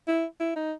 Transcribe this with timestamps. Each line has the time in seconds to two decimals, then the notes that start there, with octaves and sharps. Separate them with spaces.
0.08 E4
0.40 E4
0.56 D#4